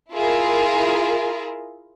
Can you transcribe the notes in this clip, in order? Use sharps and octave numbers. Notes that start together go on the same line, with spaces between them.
E4 F4 G#4 A#4